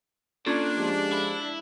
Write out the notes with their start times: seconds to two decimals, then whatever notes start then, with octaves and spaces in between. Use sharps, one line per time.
0.46 A#2 C#4 D4 F4 A4
0.76 F3 G#3 G4
1.12 E4